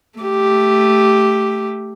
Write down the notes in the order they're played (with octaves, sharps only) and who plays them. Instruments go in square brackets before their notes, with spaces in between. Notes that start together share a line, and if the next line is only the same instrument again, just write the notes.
[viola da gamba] A3 G4